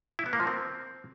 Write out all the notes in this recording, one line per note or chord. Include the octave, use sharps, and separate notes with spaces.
E4
B3
A#3
F3
C4